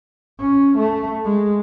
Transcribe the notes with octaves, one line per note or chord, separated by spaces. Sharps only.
C#4
A3
G#3